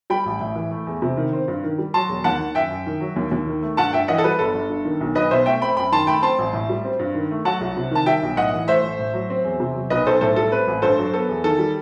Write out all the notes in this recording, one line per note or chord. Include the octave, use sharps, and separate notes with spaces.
G3 G5 B5
A1
A2
E3
A3
E2
C3
D#3
C4
G2
D#3
G3
F#3 A5 C6
E1
D#2 F#5 A5
D#3
F#2 E5 G5
F#2
D#3
F#3
D#2
D#2
D#3
A3
G2 F#5 A5
G2 E5 G5
E3 D#5 F#5
A4
G3 B4
G1 A4
G1
G2
D#3
B1
B1 B4 D#5
B2 C5 E5
A3 E5 G5
C4 G5 B5
F#2 G5 B5
D#3 A5 C6
A3 G5 B5
C4 A5 C6
A1
A2
G3
C4
G2
D#3
A3
F#3 F#5 A5
C2
C3
D#3 A5
G3 E5 G5
B1
A2 D#5 F#5
E3
A3 C5 E5
A1
A2
F#3
C4
E2
C3
F#3
B1 B4 D#5
B1 A4 C5
A2 A4 C5
G3 A4
C4 B4
A1
G2 A4 C5
F#3
B3 A4
E2
D#3 A4
G3